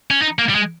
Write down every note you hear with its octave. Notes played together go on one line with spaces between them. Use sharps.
C#4
D#4
A#3
G3
G#3